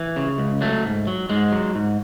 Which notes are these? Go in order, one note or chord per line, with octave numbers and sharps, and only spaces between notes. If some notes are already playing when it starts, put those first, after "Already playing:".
Already playing: E3
C#3
C#2
F#3 A3
G#2
F#3
G#2 G#3
F#3
G#2